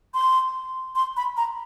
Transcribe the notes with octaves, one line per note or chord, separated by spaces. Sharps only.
C6
C6
B5
A#5